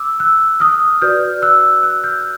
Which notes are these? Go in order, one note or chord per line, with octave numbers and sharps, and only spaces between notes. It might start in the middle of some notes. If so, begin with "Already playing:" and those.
Already playing: D6 E6
E6 F#6
D#6 F6
F#4 B4 D5 F6 G6
E6 F#6
E6 F#6
F6 G6